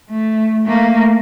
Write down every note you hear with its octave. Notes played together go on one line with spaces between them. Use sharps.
A3
A3 A#3